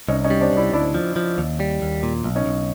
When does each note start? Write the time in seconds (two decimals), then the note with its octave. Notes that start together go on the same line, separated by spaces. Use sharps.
0.09 C2 C#4 D#4
0.24 C#4 D#4
0.30 G3
0.41 C4 D4
0.52 C2 D4 E4
0.73 D2 D4 E4
0.94 F3
1.16 F3
1.38 D#2
1.60 G3
1.82 D#2
2.03 A#2
2.24 B1
2.35 C#4 D#4
2.46 B1